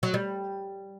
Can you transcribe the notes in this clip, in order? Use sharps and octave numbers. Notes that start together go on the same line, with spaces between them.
F#3
G3